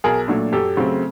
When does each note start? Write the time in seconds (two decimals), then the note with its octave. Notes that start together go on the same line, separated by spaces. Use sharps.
0.04 B1 G#4 A#4
0.28 A#2 F#3 A3 D4
0.52 F#2 G4 A4
0.77 C#3 F#3 A3 C4